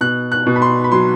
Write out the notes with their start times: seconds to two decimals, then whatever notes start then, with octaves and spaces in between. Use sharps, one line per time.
0.01 B2 F#6
0.32 F#6
0.47 B2
0.56 B5
0.62 C6
0.84 B5
0.92 F#3 C6